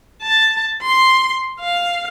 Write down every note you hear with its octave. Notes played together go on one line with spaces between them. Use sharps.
A5
C6
F5